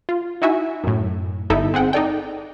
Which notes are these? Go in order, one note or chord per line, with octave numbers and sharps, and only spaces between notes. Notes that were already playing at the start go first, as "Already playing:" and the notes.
F4
D#4 E4 F#4 E5 G#5
F#2 A2
G1 D#4 E4 A4 E5
C4 G#4 F#5 G5
D#4 A4 D5 G5